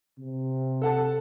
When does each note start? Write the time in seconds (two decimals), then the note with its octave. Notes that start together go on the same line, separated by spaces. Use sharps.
0.19 C3
0.82 A4 F#5 A5